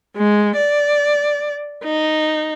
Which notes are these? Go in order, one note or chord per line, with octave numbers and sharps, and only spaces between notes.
G#3
D5
D#4